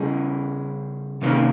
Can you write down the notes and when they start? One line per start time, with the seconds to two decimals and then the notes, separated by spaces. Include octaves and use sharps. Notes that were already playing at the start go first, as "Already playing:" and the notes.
Already playing: C#3 G3 C#4 G#4
1.22 C3 D#3 A#3 C#4